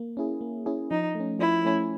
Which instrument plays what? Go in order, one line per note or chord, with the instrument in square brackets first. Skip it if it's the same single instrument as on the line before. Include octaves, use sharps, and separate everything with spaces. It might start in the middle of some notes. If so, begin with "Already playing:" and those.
Already playing: [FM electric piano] A#3
C#4 E4 G#4
A#3
C#4 E4 G#4
[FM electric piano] F3 [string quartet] D#4
[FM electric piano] A3
C#4
[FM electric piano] F3 [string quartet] E4
[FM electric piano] A3 C#4